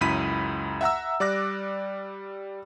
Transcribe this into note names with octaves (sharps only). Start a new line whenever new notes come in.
C#2 F#2 E4 B5 B6 D#7
E5 F#5 A#5 E6
G3 D5 D6 F#6 A#6